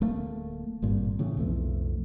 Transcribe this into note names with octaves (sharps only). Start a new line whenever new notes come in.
D1 A3 A#3
G#1 G2 A#2
A2 C#3 E3
B1 F2 A3